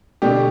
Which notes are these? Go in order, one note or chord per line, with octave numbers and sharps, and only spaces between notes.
B2 D3 G4